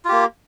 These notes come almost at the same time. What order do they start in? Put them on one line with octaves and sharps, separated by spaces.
F4 G4 A#3